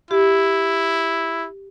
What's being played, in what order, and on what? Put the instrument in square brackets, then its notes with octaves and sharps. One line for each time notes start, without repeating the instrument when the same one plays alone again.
[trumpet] E4 [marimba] G4